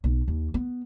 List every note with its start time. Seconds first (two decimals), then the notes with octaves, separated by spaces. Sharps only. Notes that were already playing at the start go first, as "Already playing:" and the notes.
0.04 B1
0.28 D#2
0.54 B3